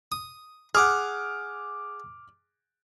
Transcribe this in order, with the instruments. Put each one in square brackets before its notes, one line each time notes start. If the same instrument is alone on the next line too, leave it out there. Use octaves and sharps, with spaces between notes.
[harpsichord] D#6
[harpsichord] G#4 F#5 [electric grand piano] D6 F6